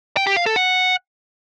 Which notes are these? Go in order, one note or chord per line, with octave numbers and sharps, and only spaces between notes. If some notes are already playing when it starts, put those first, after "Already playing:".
G5
G4
F5
A4
F#5